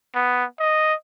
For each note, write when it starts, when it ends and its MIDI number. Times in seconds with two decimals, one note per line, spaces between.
0.15 0.44 59
0.60 0.94 75